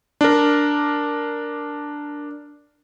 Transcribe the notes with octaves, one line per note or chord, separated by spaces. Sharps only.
D4 A#4